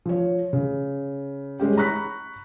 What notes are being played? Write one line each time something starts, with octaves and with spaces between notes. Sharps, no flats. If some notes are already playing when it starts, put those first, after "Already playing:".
F3 C#5
C#3
G3 G#3 C#4 G4
A#5 B5 C#6 F#6 B6